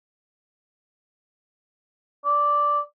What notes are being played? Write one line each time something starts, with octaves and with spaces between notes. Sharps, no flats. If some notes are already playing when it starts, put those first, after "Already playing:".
D5